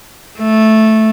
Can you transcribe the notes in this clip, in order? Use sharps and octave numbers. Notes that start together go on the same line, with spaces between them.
A3